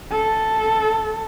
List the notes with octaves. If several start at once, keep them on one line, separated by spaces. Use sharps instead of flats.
A4